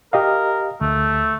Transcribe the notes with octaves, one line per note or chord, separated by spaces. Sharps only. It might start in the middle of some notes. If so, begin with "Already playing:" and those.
G4 A#4 D#5 F5
D2 A3